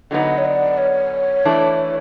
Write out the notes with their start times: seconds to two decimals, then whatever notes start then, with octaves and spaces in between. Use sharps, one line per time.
0.11 D3 F#3 B3 D#4 D#5
0.38 C#5
0.45 D5
0.78 C#5
1.45 E3 A3 D4